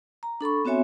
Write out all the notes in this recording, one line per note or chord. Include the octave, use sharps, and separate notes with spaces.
A#5
D4 A4 B5 C#6
B3 C4 F#4 C#5 E5 G#5